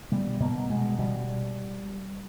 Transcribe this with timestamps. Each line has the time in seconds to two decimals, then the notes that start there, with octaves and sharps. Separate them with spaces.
0.12 B2 G3
0.40 B2 A#3
0.69 B2 G#3
0.99 B2 G3